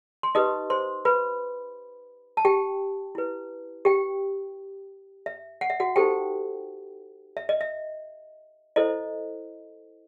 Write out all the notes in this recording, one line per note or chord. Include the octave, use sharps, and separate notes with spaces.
C6
D#4 G4 B4 D#5 D#6
C5 C6
B4 B5
A5
G4 G5
E4 B4
G4 G5
E5
F#5
E5
F#4 F#5
D#4 G4 A4 C5 G5
E5
D#5
E5
E4 A4 C5 D#5